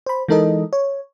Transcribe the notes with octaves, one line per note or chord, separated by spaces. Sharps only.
C5 B5
E3 G#3 D#4 A4 A#4 D#5
C#5